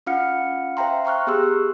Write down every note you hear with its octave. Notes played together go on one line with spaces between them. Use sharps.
C#4 F4 F5 F#5 F6 C#7
C5 E5 F5 G5 A#5 C6
G5 A#5 C#6 F6 F#6
B3 G4 G#4 C6 E6 F#6